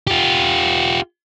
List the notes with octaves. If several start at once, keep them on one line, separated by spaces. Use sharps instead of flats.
F4 G4